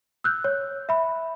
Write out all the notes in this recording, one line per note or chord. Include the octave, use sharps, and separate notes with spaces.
E6 F#6 G6
C#5
E5 B5